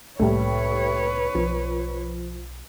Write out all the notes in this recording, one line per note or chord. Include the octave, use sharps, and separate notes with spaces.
C2 A2 G3 A3 A#3 B4 C#5
B1 F3